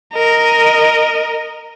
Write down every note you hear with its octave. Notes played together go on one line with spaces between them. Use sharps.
A#4 D#5